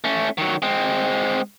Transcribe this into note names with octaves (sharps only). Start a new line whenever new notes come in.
A3 C#4
D#3 F#3
G#3 C4